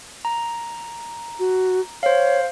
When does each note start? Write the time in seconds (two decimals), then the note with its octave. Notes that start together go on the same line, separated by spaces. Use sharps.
0.25 A#5
1.39 F#4
2.03 C5 C#5 F5